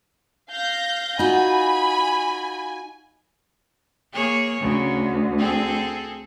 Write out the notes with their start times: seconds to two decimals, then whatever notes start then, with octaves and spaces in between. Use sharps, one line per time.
0.51 F5 G6 A#6
1.19 D#4 F4 F#4 G#5 B5
4.13 A#3 G#4 C#5
4.61 D2 C#3
5.39 C4 G#4 A4